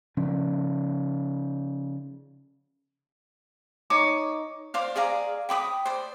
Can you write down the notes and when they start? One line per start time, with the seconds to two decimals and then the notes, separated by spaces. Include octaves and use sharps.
0.17 C#3 F3 C#4 D4
3.90 D#4 C#5 D6
4.74 C5 D5 F5
4.96 G#4 D5 F5 A#5
5.49 G5 B5 D6 D#6
5.86 C5 D5